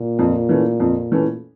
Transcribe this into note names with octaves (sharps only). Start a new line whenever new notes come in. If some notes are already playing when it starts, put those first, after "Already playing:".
Already playing: A#2
F2
E3 A3 C#4
F2
E3 A3 C#4